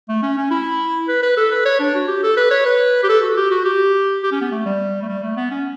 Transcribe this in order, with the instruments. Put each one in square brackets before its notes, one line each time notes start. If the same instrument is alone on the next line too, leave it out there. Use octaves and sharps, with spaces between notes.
[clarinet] A3
C#4
C#4
E4
B4
B4
A4
B4
C#5
D4
F#4
G4
A4
B4
C#5
B4
G4
A4
F#4
G4
F#4
G4
G4
C#4
B3
A3
G3
A3
G3
A3
B3
C#4